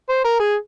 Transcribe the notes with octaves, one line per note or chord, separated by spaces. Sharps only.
C5
A#4
G#4